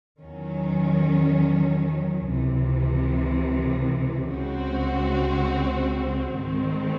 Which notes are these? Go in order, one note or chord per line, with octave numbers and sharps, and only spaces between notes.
E2 D#3 F#3 C#4
C#2 C3 E3
C#2 C#3 G#3 C4 F#4
G#2 D#3 G#3 C4